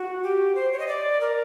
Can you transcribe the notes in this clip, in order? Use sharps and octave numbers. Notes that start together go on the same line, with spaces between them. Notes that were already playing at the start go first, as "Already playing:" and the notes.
Already playing: F#4
G4
C5
C#5
D#5
D5
A#4